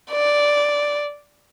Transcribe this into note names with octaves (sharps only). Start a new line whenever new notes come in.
D5